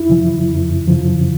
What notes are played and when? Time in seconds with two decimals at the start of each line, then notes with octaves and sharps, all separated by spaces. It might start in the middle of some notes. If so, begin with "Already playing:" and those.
Already playing: F2 E4
0.09 C#3 F3
0.49 F2
0.87 C#3 F3